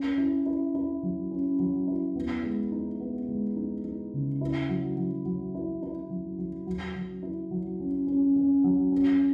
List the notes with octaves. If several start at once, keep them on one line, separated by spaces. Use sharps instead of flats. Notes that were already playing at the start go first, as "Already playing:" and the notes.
Already playing: C#4
E4
E4
E4
F#3
C#4
F#3
E4
B3
G#3
D#4
B3
G#3
D#4
D#4
C#3
E4
F#3
F#3
F#3
E4
E4
F#3
F#3
F#3
F#3
E4
F#3
C#4
C#4
C#4
F#3
C#4